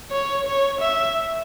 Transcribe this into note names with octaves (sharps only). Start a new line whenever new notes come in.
C#5
C#5
E5